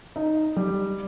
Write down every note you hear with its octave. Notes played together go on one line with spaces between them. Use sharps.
D#4
G3